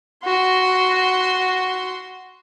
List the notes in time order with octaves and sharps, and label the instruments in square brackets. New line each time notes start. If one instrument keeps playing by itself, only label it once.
[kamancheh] F#4 C6